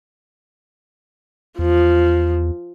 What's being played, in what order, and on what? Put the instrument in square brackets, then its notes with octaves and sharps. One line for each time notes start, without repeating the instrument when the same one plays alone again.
[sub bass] E2 [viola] F3